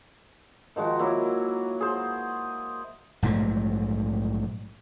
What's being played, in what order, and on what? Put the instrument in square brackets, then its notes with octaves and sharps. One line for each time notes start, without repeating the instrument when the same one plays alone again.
[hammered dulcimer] D#3 F3 G#3 F#4
F#3 A#3 E4
G#4 C5
[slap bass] A#1 G#2 F#3 A3